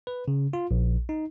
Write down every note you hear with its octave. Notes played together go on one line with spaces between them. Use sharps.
B4
C#3
F4
A#1
D#4